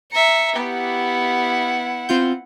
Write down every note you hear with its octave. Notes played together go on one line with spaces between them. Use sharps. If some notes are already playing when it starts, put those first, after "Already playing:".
E5 A#5 C#7
B3 E4 G4 F#5
C4 F4 G6